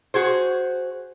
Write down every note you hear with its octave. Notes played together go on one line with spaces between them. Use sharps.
F#4 G#4 C5